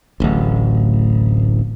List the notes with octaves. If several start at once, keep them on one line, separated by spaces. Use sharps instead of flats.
D1 A1